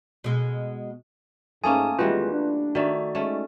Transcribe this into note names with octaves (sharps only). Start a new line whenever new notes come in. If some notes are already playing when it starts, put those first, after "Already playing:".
B2 G#3
G#2 A3 A#3 C#4 G#5 A5 D#6
E2 D#3 E3 G3 G#3 F4 F#4 B4
D4
D#3 A3 F#4 D5 E5
G#3 A3 C#4 D#4